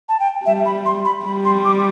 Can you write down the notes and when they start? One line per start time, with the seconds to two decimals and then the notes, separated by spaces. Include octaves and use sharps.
0.09 A5
0.20 G5
0.45 G3 E5
0.65 B5
0.86 C6
1.05 B5
1.26 G3 B5
1.45 C6
1.65 D6